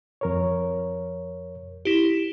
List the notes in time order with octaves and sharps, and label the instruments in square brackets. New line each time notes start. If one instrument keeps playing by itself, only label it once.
[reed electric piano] F2 A#4 C#5
[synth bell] E4 G4